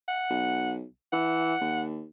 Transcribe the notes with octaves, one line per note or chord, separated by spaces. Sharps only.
F#5
B1
E3 F#5
D#2